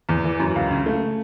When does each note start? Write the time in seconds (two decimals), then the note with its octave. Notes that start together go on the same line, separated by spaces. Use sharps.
0.09 E2
0.24 E3
0.40 F#2
0.55 C#2
0.71 C#3
0.86 A3